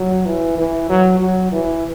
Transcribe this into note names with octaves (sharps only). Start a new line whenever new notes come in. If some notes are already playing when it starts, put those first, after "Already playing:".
Already playing: F#3
E3
E3
F#3
F#3
E3